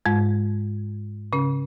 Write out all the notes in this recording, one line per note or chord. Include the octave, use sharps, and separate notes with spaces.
G#2 G#3
C#3 C#4